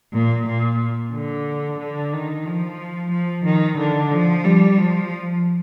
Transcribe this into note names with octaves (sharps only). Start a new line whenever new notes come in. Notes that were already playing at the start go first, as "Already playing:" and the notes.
A#2
A#2
D3
D3
D#3
F3
F3
D#3
D3
F3
G3
F3